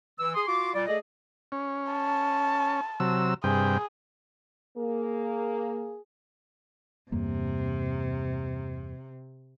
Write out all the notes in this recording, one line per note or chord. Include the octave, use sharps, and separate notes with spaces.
E3 E6
G#4 C6 D#6
F4 F#4 C6 D6
A#2 G3 D5
A3 G#4 A4 D5 D#5
C#4
A5
C3 F#3 E6
G2 C3 G#4 G5
A#3 G#4
E2 G2 C3 A#3